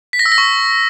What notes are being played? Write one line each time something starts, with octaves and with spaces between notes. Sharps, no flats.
B6
A#6
E6
A#6
C#6